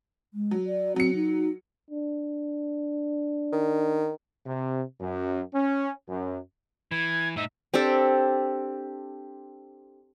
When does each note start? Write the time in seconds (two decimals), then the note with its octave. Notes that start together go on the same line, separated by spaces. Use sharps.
0.34 G#3
0.51 F#3
0.67 D5
0.96 F#3 C4 C#7
1.15 D#4
1.90 D4
3.52 D#3
4.46 C3
5.00 F#2
5.54 C#4
6.09 F#2
6.92 E3 G#6
7.36 A2 D#4 E5
7.74 C4 D4 G4 A4